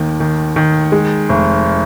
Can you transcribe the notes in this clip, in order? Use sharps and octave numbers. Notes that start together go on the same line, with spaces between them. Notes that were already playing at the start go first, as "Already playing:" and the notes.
Already playing: D#2 D#3
D#3
D#3
G#3
F1